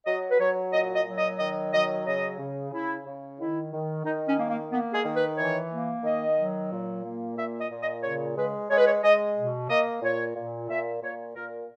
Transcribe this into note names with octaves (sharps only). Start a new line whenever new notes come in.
F#3 D#5
B4
F#3 C#5
A#2 D#5
D#5
F#3
D#5
D#3 D#5
F#3 D#5
C#3 D#5
C#3
C#3 E4
C#3
D#3 E4
D#3
D#3 D#4
C#4
A#3
A#3
A#3 B3
G#4
D#3
B4
E3 C#5
A#3
D#3 D#5
F#3
A#2
A#3
A#2 E5
D#5
A#2
D#5
C#3 C#5
G#3 B4
G#3 C#5
B4
C#5
G#3 D#5
B2
A#3 D#5
A#2 C#5
A#2
A#2 E5
A#2 C#5
A#2 A#4